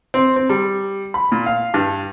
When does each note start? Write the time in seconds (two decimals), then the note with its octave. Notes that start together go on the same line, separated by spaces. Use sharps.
0.14 C4
0.36 C4
0.49 G3
1.14 B5
1.32 A#2
1.46 F5
1.74 G2